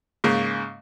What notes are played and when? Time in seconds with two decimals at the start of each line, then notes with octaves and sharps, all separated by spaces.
0.24 G#2 C#3 A#3